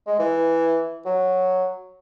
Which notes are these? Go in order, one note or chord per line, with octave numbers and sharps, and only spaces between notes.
G#3
E3
F#3